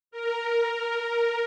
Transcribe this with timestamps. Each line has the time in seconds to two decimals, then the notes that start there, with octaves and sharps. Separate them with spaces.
0.11 A#4